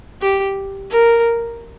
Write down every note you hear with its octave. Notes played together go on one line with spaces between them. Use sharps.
G4
A#4